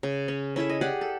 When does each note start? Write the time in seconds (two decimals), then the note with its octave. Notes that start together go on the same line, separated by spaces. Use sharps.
0.03 C#3
0.28 C#4
0.56 C#4 E4 A4 E5
0.69 D#5
0.81 G4 G#4 D5 F#5
1.01 A4